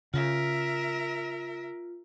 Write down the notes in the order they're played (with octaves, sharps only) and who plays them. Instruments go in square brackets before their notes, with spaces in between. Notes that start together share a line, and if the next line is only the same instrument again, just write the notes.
[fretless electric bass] C#3 [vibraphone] F4 [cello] A#4 E5